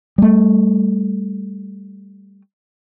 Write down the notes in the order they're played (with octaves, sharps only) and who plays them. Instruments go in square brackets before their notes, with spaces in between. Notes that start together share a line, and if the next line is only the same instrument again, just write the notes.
[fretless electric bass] G3 A3